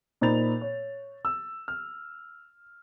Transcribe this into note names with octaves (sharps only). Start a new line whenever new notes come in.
A#2 D#4 C5 B5 A6 F7
C#5
E6
F6